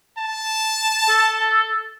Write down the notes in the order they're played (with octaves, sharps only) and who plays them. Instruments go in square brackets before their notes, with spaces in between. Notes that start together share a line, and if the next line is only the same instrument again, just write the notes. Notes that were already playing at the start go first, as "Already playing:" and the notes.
[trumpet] A5
[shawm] A4